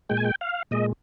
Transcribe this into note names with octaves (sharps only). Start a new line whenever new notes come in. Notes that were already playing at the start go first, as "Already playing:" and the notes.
A#2 G#3 G5
G#5
G5
F5
A#2 G#3 D#5